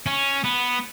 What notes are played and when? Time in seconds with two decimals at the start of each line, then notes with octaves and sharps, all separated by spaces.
0.06 C#4
0.44 B3